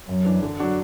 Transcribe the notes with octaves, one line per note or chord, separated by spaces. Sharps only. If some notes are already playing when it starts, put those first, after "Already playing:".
F#2 F#3
E3 D4
D3
F#3 D4 F#4